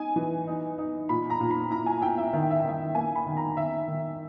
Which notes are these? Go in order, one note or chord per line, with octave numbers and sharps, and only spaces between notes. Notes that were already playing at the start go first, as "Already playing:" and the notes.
Already playing: D#4 G#5
E3
D#4
D#4
A#2 B5
A#5
A#2
B5
E4 A#5
G#5
E4 G5
E5
D#3 E5
G5
E5
G5
D#3 E5
A#3 G#5
B5
D#3
A#5
D#3 E5
D#3